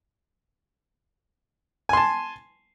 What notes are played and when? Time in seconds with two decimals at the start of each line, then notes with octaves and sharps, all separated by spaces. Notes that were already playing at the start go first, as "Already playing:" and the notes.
1.89 G#5
1.93 C6
1.97 A5